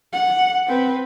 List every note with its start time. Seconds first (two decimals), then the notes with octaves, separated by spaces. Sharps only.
0.13 F#5
0.66 C4 B4